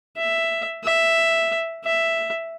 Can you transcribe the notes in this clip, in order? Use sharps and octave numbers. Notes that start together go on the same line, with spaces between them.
E5
E5
E5